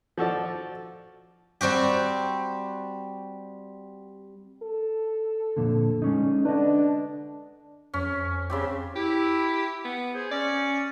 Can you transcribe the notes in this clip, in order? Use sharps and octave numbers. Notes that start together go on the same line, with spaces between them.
F3 F#4 A4 D5
G3 C4 F#4 G4
A4
F2 A#2 D3
G#3 C#4 D#4
D3 D4 B4 D#5
F2 C#4
C#3 C4 G4 G#4 D5 B5
E4 G4
B3
G#4 C5 G#5
C#4 D5